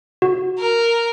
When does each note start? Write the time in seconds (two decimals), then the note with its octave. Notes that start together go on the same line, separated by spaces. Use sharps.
0.22 F#4
0.58 A#4